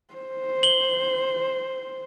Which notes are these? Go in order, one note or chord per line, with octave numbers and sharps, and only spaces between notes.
C5
F#7 G7